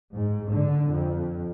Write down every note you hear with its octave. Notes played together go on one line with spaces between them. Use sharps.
G#2
D3
F2